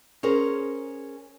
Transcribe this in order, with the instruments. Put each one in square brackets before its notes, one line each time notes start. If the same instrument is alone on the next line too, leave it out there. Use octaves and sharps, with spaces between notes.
[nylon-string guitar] C#4 G#4 A#4 C5